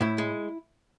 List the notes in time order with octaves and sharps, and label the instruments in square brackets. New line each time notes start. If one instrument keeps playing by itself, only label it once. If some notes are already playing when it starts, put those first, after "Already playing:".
[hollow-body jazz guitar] A2 E4
G#3